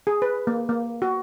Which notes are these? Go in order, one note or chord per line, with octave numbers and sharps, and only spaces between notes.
G#4
B4
A#3
A#3
F#4